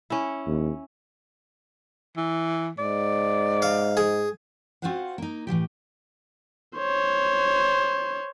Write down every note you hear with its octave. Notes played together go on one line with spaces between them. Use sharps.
C#4 E4
D#2
E3
G#2 D5
F5
G#4
C4 F4 F#4 C5 F5 F#5
A#3 D#4
A2 E3 F3 G4
C5 C#5